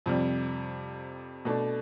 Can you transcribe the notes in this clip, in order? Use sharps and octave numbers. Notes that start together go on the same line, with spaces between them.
F2 C3 G3
B2 A3 D4